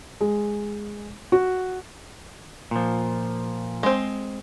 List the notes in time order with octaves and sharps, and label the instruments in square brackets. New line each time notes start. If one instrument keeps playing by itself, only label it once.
[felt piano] G#3
F#4
[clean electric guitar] A#2 F3
[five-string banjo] G#3 C4